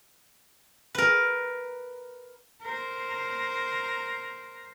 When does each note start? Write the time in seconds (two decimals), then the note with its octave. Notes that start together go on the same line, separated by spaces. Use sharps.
0.95 A#4 B4
2.63 A#4 C5